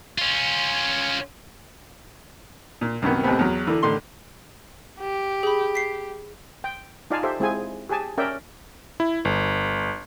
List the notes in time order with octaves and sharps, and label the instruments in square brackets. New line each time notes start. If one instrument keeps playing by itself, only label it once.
[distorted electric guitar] C#4 F4
[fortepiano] A#2
C2 F#2 D#3 B3
A1 D#2 C3 B3 C4
E2 F#3
D3 E3
A1 A2 D3 D#3 C6
[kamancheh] G4
[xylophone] G#4 B5
B6 C7
[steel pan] G5
D#4 F4 D5 F5 G#5 A5
G4 A4 C5 E5
G#3 C4 E4 F4 G#4 G#5
G4 G#4 G#5 A5
C#4 A#4 D5 E5 G5
[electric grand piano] E4
G1